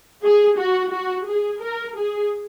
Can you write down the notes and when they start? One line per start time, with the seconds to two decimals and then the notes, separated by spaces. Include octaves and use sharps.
0.23 G#4
0.58 F#4
0.92 F#4
1.26 G#4
1.61 A#4
1.96 G#4